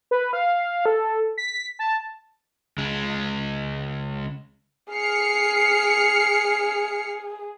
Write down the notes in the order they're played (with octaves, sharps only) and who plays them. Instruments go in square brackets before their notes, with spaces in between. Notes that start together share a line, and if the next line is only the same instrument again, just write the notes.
[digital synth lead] B4
F5
A4
B6
A5
[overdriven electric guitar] C#2 G#3
[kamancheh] G#4 [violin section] F6 C7 C#7